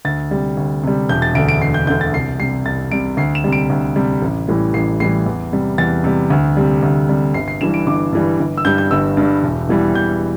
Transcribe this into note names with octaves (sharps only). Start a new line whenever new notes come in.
D2 A6
C3 G3
D2
C3 G3
E1 G6
A6
D2 D3 D7
D7
E1 C7
G6
D2 D3 G6
A6
C2 C7
C3 G3 C7
C2 A6
C3 G3 D7
D2 C7
E7
C3 G3
D7
D2
C3 G3
A1
A2 E3 G3
A1 C7
A2 E3 G3 C7
E2
C3 G3
E2 A6
C3 G3
D2
C3 G3
D2
C3 G3
G1 C7
C7
G2 E3 G3 E7
D7
G1 D6
G2 E3 G3
G1
E6
G2 G3 G6
G6
G1 E6
G2 G3
E1
E2 E3 G3
E1 G6